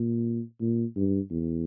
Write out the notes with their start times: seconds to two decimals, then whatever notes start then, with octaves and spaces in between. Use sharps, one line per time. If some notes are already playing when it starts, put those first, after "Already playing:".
Already playing: A#2
0.61 A#2
0.96 G2
1.30 E2